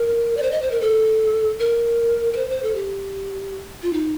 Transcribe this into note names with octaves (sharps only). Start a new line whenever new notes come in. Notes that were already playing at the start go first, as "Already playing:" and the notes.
Already playing: A#4
D5
C5
D#5
C5
A#4
A4
A#4
A#4
C5
C5
A4
G4
F4
D#4